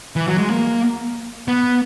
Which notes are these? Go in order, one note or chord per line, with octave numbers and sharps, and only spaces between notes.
E3
F#3
G#3
A#3
B3